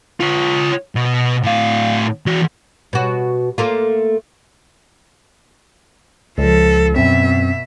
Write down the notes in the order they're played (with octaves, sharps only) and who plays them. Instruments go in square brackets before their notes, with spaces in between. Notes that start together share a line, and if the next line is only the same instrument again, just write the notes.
[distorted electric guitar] F4 C#5
B2
A2 F5
E3 F#4
[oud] B2 F#4
A3 A#3 F4
[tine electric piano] C#2 [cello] F3 A4
[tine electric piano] F#2 C4 [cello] B2 E5